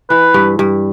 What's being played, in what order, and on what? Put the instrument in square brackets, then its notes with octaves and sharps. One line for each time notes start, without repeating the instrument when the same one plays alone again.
[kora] E3 [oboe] B4
[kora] G2
G2